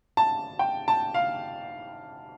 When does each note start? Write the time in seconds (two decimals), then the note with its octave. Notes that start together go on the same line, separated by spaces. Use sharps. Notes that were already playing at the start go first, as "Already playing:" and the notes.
0.17 A5
0.59 G5
0.88 A5
1.14 F5